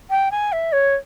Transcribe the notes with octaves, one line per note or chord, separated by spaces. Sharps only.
G5
G#5
E5
C#5